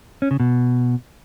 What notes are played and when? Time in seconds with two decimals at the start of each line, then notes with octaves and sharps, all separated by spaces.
0.22 C#4
0.31 C#3
0.40 B2